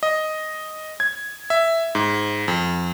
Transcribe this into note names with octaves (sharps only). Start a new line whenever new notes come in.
D#5
G#6
E5
G#2
F2